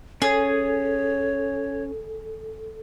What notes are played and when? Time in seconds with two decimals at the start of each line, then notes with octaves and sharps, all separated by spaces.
0.22 C#4 G#4 A4 C#5 D#6